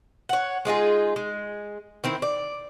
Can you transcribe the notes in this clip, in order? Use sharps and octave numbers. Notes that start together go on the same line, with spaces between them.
C#5 F#5
G#3 D#4 F4 G#4
G#3
D#3 C4 E4
D5